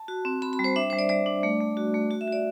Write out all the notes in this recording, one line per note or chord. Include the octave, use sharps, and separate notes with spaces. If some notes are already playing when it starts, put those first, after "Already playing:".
Already playing: A5
F#4
C4
C4 B5
B5
G3
C5
D4 E5
G3 C5
D5
G3 D5
D4
A3
A3
F#4
A3
F#4
E5
F#4 D5